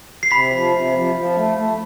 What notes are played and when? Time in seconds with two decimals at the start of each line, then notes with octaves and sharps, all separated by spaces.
0.23 C7
0.31 C3 B5 B6
0.52 F3
0.73 C3
0.94 F3
1.15 F3
1.35 A3
1.57 A3